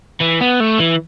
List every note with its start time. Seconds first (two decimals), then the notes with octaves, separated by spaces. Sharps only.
0.20 E3
0.41 B3
0.60 A3
0.80 E3